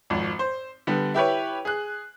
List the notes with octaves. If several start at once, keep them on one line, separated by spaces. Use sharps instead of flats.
G#1 F2
C5
D3 G3 B3
E4 G4 B4 C#5
G#4 F#6